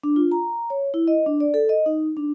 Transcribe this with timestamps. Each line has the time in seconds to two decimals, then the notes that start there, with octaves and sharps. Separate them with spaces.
0.04 D4
0.16 F4
0.31 A#5
0.70 C#5
0.94 E4
1.08 D#5
1.26 D4
1.40 D5
1.54 A4
1.69 D#5
1.86 D#4
2.17 D4